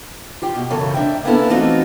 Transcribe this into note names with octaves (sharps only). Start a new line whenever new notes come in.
F4 G4 G5
B2
F#2 C#3 E3 A4 C#5
G#2 D4 E5 G5
A#3 B3 C#4 D4 E4 A4
E3 A3 C4 D#4 F4 F#4